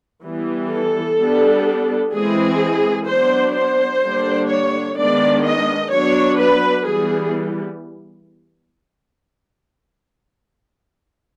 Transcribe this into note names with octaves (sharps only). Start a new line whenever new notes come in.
E3 G3 B3
A4
G3 B3 D4
E3 G#3 C4 G#4
F#3 B3 D4 C5
C5
D3 G3 A#3 D4
C#5
D#3 G#3 B3 D4 D5
D#5
F#3 B3 D4 C#5
B4
E3 G3 B3 G#4